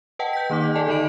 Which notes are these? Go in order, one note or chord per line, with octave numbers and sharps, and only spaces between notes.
B4 D#5 F#5 G5 A5
G6 B6
D#3 A#3 D#4 D6
D#5
A4 D5 D#5 G#5 A5
D3 D#4 D#5 B5 D7 F#7